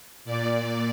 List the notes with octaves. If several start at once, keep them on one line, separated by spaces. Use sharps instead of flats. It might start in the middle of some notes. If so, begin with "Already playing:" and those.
A#2 D5